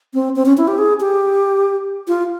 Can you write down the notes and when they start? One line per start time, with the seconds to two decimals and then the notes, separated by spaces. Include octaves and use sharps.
0.14 C4
0.36 C4
0.46 C#4
0.58 E4
0.68 G4
0.78 G#4
1.00 G4
2.08 F4